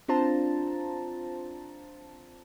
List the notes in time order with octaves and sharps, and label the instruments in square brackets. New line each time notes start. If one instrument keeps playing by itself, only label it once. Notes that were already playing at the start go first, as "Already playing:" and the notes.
[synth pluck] C4 D4 F4 C5 A5 A#5